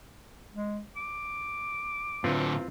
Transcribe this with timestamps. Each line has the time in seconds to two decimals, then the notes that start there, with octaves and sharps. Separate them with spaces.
0.54 G#3
0.96 D6
2.24 A2 D3 C4 F4 B4